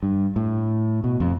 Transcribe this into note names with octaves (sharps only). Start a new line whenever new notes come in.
G2
A2
B2
F2